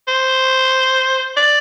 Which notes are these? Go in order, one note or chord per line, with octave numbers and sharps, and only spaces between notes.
C5
D5